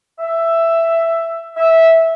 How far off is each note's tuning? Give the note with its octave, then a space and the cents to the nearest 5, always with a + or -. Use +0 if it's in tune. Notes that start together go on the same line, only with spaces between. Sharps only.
E5 +10
E5 -10